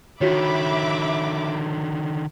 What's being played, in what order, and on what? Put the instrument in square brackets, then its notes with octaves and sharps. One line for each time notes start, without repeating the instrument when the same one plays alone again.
[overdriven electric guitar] D3 D#3 [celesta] F4 F#4 C#5 [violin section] E5 B5 D6